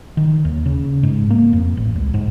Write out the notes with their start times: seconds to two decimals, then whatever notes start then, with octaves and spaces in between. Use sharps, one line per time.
0.17 D#3
0.45 D#2
0.66 C#3
1.03 G#2
1.30 A#3
1.53 F2
1.77 A1
1.95 C#2
2.14 G#2